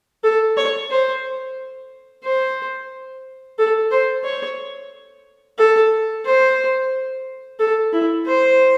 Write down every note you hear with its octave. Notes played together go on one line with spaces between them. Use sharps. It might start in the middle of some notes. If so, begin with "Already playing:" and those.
A4
C#5
C5
C5
A4
C5
C#5
A4
C5
A4
E4
C5